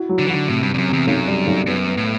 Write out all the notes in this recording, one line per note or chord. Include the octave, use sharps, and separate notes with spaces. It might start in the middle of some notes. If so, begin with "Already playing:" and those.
Already playing: E4 F#4
F#3
D3
E3
D3 F#4
A2 C3
G2
C3
G2
F#2
E2 C3
B1 F#2
G3
B1
F#2 B3
B3
A2